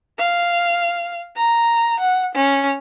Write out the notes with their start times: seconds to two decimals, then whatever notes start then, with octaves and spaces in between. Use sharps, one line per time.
0.18 F5
1.36 A#5
2.00 F#5
2.35 C#4